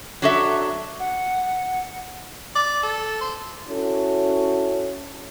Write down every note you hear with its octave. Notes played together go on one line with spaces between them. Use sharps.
F#3 D4 F#4 A4 E5
F#5
D5
A4
C5
C#4 E4 F#4 A4